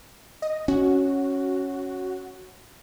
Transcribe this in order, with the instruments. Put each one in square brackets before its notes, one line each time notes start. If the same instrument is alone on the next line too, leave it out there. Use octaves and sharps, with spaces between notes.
[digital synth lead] D#5
[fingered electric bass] C#4 [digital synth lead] F#4